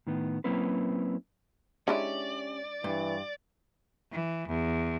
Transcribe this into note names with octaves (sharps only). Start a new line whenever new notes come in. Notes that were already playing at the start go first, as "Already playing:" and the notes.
A2 D#3 B3
F#3 A#3 C4 C#4 E4 B4
G#3 C#4 D4 E4 G4 D5
G2 E3
E3
E2